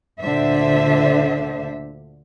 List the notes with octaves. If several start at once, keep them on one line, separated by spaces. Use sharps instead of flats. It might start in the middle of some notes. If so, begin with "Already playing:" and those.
D2 A#2 D3 D4 C5 E5